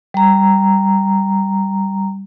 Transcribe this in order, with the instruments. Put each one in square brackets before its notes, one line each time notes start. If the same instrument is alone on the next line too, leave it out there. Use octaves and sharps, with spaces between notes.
[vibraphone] G3 A#5